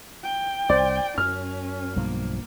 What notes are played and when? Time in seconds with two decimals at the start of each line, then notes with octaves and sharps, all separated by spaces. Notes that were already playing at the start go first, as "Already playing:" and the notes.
0.23 G5
0.69 C2 C5 D5
1.18 F#2 C#4 F6
1.96 B1 G2 F3 A#3